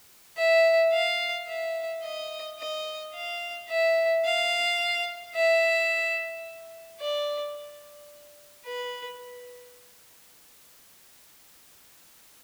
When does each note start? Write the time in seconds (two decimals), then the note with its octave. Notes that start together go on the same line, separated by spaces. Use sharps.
0.37 E5
0.93 F5
1.48 E5
2.03 D#5
2.59 D#5
3.14 F5
3.69 E5
4.24 F5
5.35 E5
7.00 D5
8.65 B4